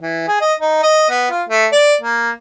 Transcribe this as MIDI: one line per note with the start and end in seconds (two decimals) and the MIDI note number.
0.01 0.24 52
0.28 0.37 68
0.41 0.54 75
0.60 0.81 63
0.83 1.09 75
1.10 1.29 59
1.30 1.43 65
1.49 1.66 57
1.72 1.94 74
2.01 2.30 58